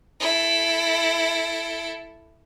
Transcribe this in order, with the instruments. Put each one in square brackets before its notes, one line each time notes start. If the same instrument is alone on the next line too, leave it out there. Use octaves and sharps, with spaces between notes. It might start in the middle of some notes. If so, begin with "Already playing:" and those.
[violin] E4 A4